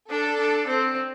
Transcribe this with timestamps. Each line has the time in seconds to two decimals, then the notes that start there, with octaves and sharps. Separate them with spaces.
0.11 D4 A4
0.39 D4
0.68 C4